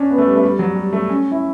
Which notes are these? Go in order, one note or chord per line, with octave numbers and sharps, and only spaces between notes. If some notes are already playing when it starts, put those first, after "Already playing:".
Already playing: C#4 D4
B3
A3
G3
A3
G3
F#3
G3
A3
C#4
E4